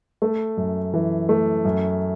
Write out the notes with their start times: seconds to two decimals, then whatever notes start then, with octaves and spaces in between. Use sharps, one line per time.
0.22 A3
0.57 F#2
0.94 E3
1.29 A3
1.65 F#2